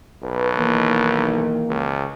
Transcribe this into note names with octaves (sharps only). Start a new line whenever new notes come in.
B1 B4
D#3 E3 A#3
C#2